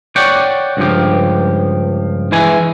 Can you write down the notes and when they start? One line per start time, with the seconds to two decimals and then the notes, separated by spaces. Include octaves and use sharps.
0.16 C#5 D5 F#5 G5
0.77 C#2 G2 F3 G4
2.32 E3 G#3 E4 G#5